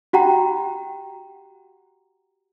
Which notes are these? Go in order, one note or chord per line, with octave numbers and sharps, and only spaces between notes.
F#4 G4 F#5 G5 A#5